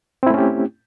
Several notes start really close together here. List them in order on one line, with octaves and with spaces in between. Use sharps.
C4 E4 A3 C#4 G4